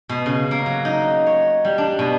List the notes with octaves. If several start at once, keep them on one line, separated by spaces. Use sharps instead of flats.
B2
C#3
A#3
F#3
D#4
C#5
G3
D4
B2